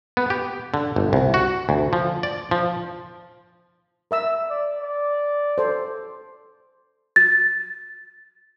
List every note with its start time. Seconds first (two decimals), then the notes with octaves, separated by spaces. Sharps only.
0.17 B3
0.30 G4
0.74 D3
0.96 G1
1.13 C2
1.34 F#4
1.69 D2
1.93 F3
2.23 D5
2.51 F3
4.11 A#4 E5 E6
4.50 D5
4.82 D5
5.58 A4 C5
7.16 A6